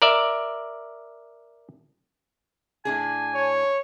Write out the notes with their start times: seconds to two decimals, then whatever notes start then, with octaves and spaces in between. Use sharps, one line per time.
0.02 A#4 D5 E5
2.85 A2 D4 G#4 G#5
3.35 C#5